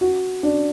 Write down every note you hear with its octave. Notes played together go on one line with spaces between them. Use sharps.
F#4
D4